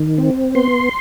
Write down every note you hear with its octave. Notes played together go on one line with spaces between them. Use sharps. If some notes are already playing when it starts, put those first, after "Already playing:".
Already playing: D#3
C4
B3 C6